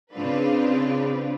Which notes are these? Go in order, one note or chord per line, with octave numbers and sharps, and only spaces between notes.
C#3 C4 D4 F4 B4